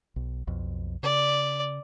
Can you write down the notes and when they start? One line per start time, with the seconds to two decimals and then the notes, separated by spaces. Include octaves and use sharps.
0.16 B1
0.47 B1 F2
1.03 C#3 D5